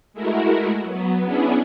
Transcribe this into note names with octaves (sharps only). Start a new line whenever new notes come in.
G#3 A3 E4 F#4 A#4
F#3 B3
B3 C#4 D4 E4 G#4